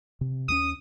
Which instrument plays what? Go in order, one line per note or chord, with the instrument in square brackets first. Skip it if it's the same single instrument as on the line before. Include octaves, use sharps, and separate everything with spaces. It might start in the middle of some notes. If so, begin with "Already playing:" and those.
[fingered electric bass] C3
[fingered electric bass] D#2 G3 C#4 [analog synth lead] D#6